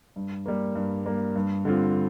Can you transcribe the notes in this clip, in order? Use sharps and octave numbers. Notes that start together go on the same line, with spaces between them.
G2
G3 A#3
G2
G3 A#3
G2
D3 G3 C4 F4